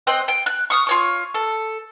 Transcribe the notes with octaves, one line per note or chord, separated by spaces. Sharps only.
C4 D#5 G5 F#6
G5
F#6
C#6 D#6 F6
F4 C#5 C#6
A4